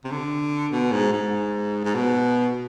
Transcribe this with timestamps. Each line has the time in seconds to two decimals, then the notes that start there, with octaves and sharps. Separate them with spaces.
0.04 C3
0.11 D3
0.72 B2
0.92 G#2
1.13 G#2
1.85 G#2
1.95 B2